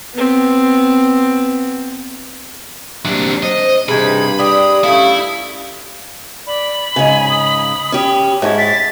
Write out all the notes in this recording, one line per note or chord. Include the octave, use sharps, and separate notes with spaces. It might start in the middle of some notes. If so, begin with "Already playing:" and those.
B3 C4
F#3 G3 A#3 C4 D4 E5
C5 D#5
G2 C3 E3 D#4 G#4 B5
D4 G4 D#6
A3 C#4 E4 G4 A4 F5
D5 B5
G#2 C#3 G#5
D#6
C#4 G4
G#2 E4 C#5 A5
A6 B6